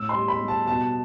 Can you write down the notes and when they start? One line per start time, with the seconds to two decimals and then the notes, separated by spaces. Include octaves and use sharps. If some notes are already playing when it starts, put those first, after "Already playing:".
Already playing: A2 E6
0.09 C6
0.15 G3
0.28 B5
0.41 G3
0.48 A5
0.67 B2 A5